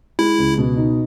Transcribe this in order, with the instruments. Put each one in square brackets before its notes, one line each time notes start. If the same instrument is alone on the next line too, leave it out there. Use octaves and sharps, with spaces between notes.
[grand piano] G#3 [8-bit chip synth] E4
[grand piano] C#2
B2
D#4